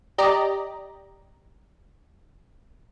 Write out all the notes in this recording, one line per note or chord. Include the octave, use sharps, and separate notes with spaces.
G4 D5 D#5 A#5